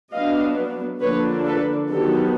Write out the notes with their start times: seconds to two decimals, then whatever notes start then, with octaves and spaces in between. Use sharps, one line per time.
0.13 F#3 B3 D4 D#5 F5
1.02 D3 F3 A#3 D4 B4 C#5
1.46 A4 B4
1.91 D#3 F#3 B3 G4 A4